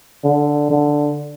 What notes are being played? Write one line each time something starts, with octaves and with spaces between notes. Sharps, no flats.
D3
D3